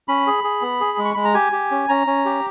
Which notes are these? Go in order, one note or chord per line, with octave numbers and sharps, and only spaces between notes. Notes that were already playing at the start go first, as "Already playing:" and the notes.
C#4 B5
G#4
G#4
B3
G#4
G#3
C#6
G#3 B5
A#5
G4 G#5
G4
C#4
C#4 A#5
C#4
G4